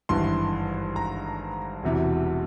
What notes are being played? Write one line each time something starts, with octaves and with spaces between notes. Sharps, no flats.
G#1 G2 E3 C6
A#5
E1 E2 C3 E3